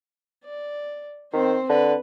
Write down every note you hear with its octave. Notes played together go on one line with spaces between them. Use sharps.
D5
D#3 C4 C5
D3 B4